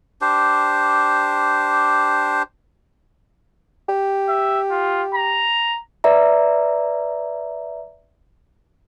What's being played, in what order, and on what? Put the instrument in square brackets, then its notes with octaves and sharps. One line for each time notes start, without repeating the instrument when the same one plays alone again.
[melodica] D4 G4 C5
[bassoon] G4
[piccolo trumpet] E5
F4
A#5
[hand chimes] B4 D5 E5 A#5